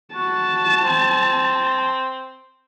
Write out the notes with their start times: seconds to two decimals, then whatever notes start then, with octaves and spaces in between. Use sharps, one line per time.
0.15 F#4 A5
0.83 C4